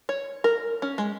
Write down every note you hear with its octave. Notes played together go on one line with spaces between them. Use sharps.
C#5
A#4
C#4
G#3